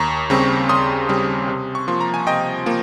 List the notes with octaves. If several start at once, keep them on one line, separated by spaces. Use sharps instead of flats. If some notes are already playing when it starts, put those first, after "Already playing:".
Already playing: D#2 A#5 C#6
C#3 G3 C4
D#2 C6 D#6
C#3 G3 C4
C3
C#6
F3 A#3 C6
A#5
G#5
C3 D#5 G5
F3 A#3